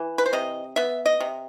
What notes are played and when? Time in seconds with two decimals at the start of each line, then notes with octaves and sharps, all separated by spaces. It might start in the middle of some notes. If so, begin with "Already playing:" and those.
Already playing: E3
0.18 B4
0.26 C5
0.33 C3 D#5
0.76 B3 E5
1.06 D#5
1.20 C3